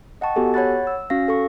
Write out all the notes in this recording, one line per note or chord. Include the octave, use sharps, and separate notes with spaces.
D#5 F#5 G5 A5 C#6
B3 F#4 G4 A4 G#5
C#5 F#5 B5 F#6 A6
E6
C#4 F#4 F5 A#6
A4 C#6